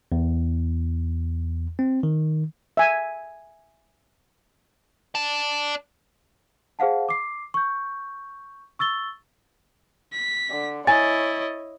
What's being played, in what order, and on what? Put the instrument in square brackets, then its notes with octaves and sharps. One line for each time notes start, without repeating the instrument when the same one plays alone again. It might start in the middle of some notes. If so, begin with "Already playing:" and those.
[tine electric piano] E2
C4
D#3
[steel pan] E5 G#5
[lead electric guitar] D5 A5
[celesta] G#4 C5 F5 F#5 A5
D6 C7
C#6 G6
C#6 E6 A6 G7
[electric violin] B6
[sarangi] D3
[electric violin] E4 D#5 [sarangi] C#5 [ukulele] G#5 [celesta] A6